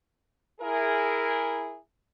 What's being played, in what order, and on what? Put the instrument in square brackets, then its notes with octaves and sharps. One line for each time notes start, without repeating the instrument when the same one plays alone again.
[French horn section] E4 G#4 A#4